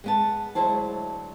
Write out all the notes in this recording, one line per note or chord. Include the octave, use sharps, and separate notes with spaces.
G#3 B3 A5
D2 F#3 G#3 E4 C5 A5